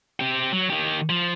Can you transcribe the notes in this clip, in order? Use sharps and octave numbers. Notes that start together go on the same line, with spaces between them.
C4 G4
F#3
D#3 G4
F3